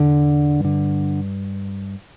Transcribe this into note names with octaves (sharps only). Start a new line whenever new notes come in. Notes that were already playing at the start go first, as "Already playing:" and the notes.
Already playing: E2 D3
G2 D3